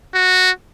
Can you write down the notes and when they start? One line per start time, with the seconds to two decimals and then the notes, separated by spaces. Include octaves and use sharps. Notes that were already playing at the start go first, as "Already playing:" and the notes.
0.14 F#4